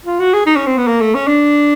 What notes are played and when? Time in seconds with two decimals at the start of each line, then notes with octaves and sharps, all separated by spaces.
0.05 F4
0.20 F#4
0.33 G#4
0.46 D#4
0.56 C#4
0.66 C4
0.77 B3
0.87 A#3
1.01 A3
1.14 C#4
1.27 D4